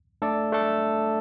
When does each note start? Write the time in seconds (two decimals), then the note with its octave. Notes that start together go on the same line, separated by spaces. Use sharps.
0.22 A3 D4 A4 D5
0.52 A3 D4 A4